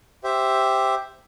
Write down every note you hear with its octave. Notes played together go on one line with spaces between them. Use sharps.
G4 C5 E5